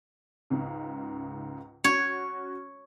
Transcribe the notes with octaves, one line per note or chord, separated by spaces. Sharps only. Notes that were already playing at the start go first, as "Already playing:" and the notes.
C#2 G#2 C#3
C#4 F#4 C#5